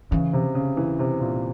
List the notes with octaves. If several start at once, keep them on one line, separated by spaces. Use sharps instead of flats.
C#3 E3
C3
C#3
E3
C3
A#2